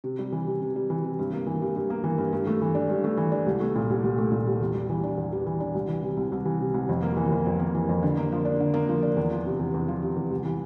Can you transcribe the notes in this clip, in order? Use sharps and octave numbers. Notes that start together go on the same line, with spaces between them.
C3
G3
E3
C3
C3
G3
E3
C3
G2
A#3
E3
G2
G2
A#3
E3
G2
G2
A3
E3
D4
G2
A3
E3
D4
C2
A3
A#2
C2
C2
A3
A#2
C2
E2
G3
E3
D4
E2
G3
E3
D4
C2
E3
C3
C2
C2
E3
C3
C2
F2
A#3
E3
F2
F2
A#3
E3
F2
D3
A#3
F3
D4
D3
A#3
F3
D4
E2
F3
C3
E2
E2
F3
C3
E2
C2
E3